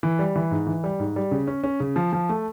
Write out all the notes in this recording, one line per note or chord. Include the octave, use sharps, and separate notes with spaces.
E3
G3
E3
G#2
E3
G3
G#2
G3
C#3
C#4
C#4
C#3
F3
F3
A3